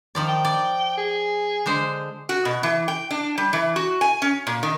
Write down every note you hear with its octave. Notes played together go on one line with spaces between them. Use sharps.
D#3 F3 D5
G5
D5
G#4
D3 G#3 C5
F#4
B2
E3
G5
D4
G3
E3
F#4
G#5
C#4
A#2
D#3